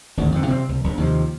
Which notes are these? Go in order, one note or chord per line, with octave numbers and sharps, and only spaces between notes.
G#1 D2 A2
F2 G#2 D3
C3 A#3 C4
C2
A#1
D#2 C3 F3